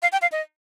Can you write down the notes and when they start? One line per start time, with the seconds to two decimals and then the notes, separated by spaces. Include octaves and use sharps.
0.02 F5
0.12 G5
0.22 F5
0.32 D#5